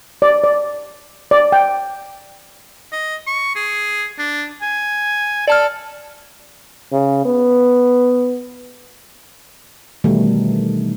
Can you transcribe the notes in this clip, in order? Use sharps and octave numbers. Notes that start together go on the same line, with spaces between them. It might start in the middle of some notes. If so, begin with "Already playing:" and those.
D5
D5
D5
G5
D#5
C#6
G#4
D4
G#5
A4 D5 A5 F6
C#3
B3
B2 D#3 E3 G3 A3 D#4